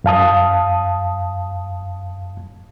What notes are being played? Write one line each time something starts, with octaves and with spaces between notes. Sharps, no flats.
F#2 F5 A5 D#6